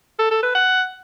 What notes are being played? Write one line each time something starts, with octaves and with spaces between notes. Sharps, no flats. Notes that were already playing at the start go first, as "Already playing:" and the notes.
A4
A4
B4
F#5